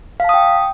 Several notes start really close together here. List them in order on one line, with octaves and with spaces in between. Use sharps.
F5 A5 D#6 G5